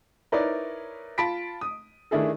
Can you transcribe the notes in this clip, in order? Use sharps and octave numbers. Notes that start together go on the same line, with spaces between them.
D#4 E4 A#4 B4 C#5 D5
F4 A5 B5 B6 D7
D#6
D#3 A3 D4 E4 G#4 A4